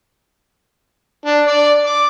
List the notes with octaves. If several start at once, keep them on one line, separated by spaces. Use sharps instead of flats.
D4
D5
D6